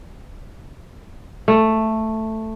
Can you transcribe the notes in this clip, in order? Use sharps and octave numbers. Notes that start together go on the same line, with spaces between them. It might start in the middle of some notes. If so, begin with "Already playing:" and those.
A3